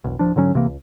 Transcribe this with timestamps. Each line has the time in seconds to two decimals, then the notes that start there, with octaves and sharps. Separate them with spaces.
0.04 E1 B1
0.19 D1 F3 D4
0.36 G#2 D3 F#3 C#4
0.54 B1 C3 E3 A#3
0.66 C#2